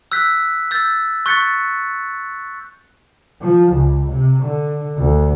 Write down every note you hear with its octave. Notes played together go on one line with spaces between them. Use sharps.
E6 F#6 G6 B6
E6 G6 A6
C#6 F#6 G6 A6 B6 C#7
F3
C#2
C3
D3
D2